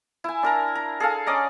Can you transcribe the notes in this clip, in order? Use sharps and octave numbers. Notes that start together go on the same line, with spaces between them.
E4 G#5
D4 A#4 A#5
A#5
G#4 A4 F5
C#4 D5 D#5 A#5